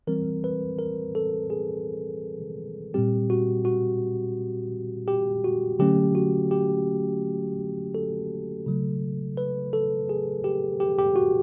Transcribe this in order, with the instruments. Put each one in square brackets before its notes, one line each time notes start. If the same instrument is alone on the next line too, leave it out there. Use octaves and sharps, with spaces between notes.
[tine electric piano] E3 G3 C4 A#4
B4
A#4
A4
G#4
A#2 G3 C4 G4
F#4
F#4
G4
F#4
D3 F#3 A3 C#4 G4
F#4
G4
A4
C#3 F#3 A3
B4
A4
G#4
G4
G4
G4
F#4